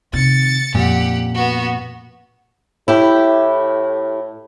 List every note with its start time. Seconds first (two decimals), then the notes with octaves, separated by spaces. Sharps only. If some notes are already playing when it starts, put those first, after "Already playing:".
0.13 C3 D#3 A6 C#7
0.75 F2 A#2 C#4 G4 F#5
1.34 B3 F#4
2.88 A2 E4 G4